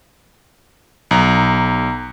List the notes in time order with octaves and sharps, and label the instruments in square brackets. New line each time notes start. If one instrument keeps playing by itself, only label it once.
[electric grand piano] B1 A#5